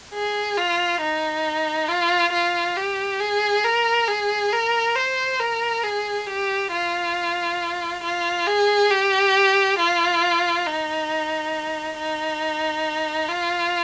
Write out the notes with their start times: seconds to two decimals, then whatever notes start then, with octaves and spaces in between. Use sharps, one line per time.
0.14 G#4
0.57 F4
1.01 D#4
1.89 F4
2.33 F4
2.77 G4
3.20 G#4
3.65 A#4
4.08 G#4
4.53 A#4
4.96 C5
5.40 A#4
5.84 G#4
6.27 G4
6.72 F4
8.03 F4
8.47 G#4
8.90 G4
9.78 F4
10.66 D#4
11.98 D#4
13.29 F4